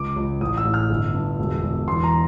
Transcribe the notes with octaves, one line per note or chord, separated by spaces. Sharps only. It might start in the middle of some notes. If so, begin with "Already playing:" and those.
Already playing: C#2 D6
C#2
A1 D#6
E6
A2
F6
G1
G2
E1
E1
E2 C6
A#5